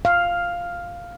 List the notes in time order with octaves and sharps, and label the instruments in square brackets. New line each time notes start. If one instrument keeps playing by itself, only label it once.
[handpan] F5